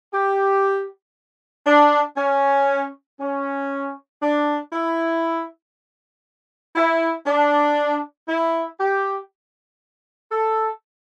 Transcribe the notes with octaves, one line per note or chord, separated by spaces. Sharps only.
G4
D4
C#4
C#4
D4
E4
E4
D4
E4
G4
A4